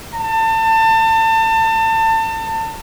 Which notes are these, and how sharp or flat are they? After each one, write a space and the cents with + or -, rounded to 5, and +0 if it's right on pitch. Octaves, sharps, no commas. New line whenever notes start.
A5 +30